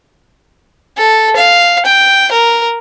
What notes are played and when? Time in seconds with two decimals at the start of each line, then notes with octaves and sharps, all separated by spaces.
0.97 A4
1.36 F5
1.85 G5
2.32 A#4